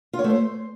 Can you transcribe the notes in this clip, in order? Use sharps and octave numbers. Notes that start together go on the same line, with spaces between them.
F4
C#5
A3
C5